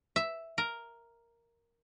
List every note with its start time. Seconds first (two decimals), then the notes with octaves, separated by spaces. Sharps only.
0.16 E5
0.58 A#4